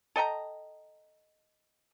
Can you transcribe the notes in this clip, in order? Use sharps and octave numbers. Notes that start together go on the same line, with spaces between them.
A4 D#5 G5 A#5